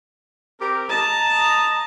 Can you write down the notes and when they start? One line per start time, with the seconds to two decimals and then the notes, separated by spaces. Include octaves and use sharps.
0.60 C4 G4 A#4
0.89 D#5 A5 A#5